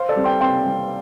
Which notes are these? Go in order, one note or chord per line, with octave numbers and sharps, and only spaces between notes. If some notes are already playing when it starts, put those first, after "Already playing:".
Already playing: C5 F5
A4 D5
G3 C4
G5 C6
C3 G5 C6
G3 C4